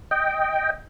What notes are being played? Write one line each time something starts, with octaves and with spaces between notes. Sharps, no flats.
D#5 G5